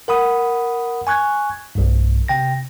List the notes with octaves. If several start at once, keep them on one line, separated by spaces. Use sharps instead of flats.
A#4 F#5 B5 D#6
G#5 C#6 F#6 G#6
B1 G2
C3 G5 A#6